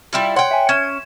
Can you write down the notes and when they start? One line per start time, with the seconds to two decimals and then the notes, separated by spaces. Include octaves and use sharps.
0.13 G3 E4 F4
0.36 C#5 F#5 G5 C6
0.51 E5 G#5
0.69 C#4 G#6 E7